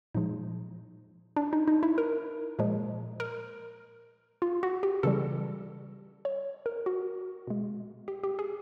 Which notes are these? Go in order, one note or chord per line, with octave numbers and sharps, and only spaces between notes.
A#2 F3 G#3 D#4
D4
D#4
D#4
E4
A#4
A#2 F3 G#3
A#4
F4
F#4
G4
C#3 E3 G3 A4
C#5
A#4
F#4
B2 G#3
G4
G4
G#4